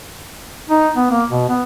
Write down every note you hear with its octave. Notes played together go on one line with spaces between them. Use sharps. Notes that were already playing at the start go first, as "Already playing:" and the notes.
D#4
B3
A#3
B2
B3